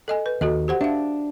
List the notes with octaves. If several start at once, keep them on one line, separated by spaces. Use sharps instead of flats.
A4 D#5 G#5
B4
D#2 F#4 A4 D#5
G4 C5 F#5
D4 E5 F5